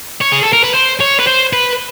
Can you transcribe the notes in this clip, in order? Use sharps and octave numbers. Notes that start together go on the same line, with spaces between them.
C#5
G#4
A4
A#4
B4
C5
C#5
B4
C5
B4